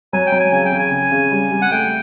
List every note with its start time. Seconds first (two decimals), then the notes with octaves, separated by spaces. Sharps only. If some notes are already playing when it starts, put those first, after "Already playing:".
0.13 F#3 G#5
0.26 G5
0.32 F#3
0.39 G#5
0.52 C#3 G#5
0.66 G5
0.72 C#3
0.79 G#5
0.92 C#3
1.12 C#3
1.31 G3
1.51 G3
1.62 F#5
1.71 A3 G5